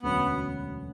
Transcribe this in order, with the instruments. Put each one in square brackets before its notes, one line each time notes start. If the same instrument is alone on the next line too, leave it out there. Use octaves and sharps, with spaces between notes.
[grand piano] E1 D2 D3 F#3 C#4 [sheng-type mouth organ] B3